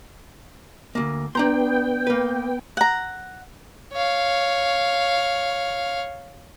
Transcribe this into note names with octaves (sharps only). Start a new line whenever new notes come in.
D2 A#3
B3 D4 G5 A#5 C6
A#3 B4
F#5 A#5
C#5 F5